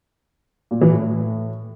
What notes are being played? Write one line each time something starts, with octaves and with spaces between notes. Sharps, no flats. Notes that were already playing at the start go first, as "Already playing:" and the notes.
A#2
E3
A2